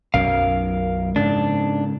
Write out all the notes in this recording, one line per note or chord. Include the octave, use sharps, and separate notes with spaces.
B1 F#2 F#3 A#4 F5
G#2 C#3 D4